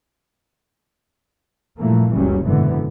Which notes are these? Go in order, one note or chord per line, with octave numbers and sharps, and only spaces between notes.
G2 A#2 E3 F3 A3 A#3
F#1 C#2 F#3 G3 C#4
G#2 B2 D3 E3 B3